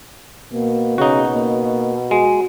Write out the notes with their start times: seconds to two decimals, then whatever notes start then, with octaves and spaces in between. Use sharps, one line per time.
0.53 B2 A#3
0.98 C#3 D#4 F#4
1.34 A#3
2.11 G#3 F#4